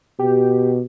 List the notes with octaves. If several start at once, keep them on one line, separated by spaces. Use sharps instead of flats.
B2 G4